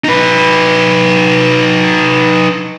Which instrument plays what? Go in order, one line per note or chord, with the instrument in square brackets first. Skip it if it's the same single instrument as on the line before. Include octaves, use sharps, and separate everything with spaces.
[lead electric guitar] D#4 B4